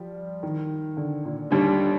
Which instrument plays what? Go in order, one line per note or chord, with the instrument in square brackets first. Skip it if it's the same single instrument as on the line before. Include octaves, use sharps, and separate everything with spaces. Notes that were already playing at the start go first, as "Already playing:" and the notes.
Already playing: [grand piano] F3 G3
D#3
D3
A#2
[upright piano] D#2 D3 G3